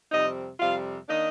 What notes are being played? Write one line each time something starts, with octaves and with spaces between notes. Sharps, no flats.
F2 C3 G3 C4 D#4 D#5
F2 C3 G3 C4 F4 F5
D#3 A#3 D4 D#4 D#5